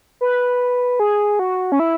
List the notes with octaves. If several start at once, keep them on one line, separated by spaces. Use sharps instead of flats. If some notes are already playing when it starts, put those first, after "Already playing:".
B4
G#4
F#4
C#4
E4